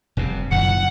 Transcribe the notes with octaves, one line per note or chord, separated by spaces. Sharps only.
F1 G2 C3
F#1 F#2 A#2 D#3 F#5